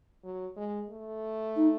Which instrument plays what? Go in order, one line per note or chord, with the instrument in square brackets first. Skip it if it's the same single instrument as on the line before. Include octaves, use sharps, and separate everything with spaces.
[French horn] F#3
G#3
A3
[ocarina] D#4